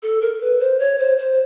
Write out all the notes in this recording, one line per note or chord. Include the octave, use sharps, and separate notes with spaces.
A4
A#4
B4
C5
C#5
C5
C5